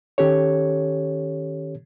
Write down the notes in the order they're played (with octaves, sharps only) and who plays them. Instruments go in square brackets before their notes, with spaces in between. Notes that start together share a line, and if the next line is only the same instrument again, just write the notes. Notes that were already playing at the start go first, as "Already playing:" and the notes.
[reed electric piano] D#3 C#4 G4 A4 C#5